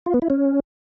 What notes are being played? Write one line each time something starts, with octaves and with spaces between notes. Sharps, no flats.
F4
B3
E4
C#4